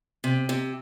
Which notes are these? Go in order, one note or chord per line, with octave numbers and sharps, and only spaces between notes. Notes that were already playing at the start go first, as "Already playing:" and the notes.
C3
C3